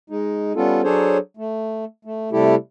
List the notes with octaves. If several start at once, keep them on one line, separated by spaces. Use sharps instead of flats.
G#3 D#4
G3 B3 C#4 F4 A4
F#3 D4 G#4 A4 C5 C#5
A3
A3
C3 G3 A3 E4 G4 A4